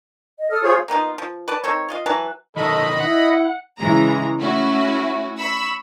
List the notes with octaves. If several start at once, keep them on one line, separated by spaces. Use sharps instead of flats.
D#5
A4 D#6 F6
F4 G#4 C5 C#5
A#3 B3 D#4 F4
F3
B4 D5 A5
D#3 C4 A4 C#5
F4 D#5 F5
E3 F#3 B4 A5
D#3 F#3 A4 D#5 B5
E4 F#5
C#3 E3 G#3 A#5
A3 C#4 E4 F#4
B5 C#6 E6